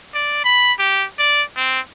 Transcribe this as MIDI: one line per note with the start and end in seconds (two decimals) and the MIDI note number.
0.14 0.41 74
0.44 0.72 83
0.79 1.06 67
1.19 1.43 74
1.57 1.80 60